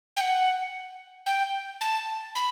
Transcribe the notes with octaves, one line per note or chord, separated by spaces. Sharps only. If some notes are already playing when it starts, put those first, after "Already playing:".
G5
F#5
G5
A5
B5